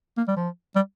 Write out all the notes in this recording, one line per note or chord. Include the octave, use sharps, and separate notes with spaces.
A#3
G3
F3
G3